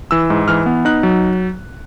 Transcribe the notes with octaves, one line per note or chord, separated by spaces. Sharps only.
E3 E6
G#2
E3 F6
B3
D#4 F#6
F#3